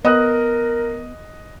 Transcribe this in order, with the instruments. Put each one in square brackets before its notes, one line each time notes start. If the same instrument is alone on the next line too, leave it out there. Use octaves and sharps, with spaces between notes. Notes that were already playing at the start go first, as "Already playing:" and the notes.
[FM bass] B3 [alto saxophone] A#4 [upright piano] D#5 D#6 F#6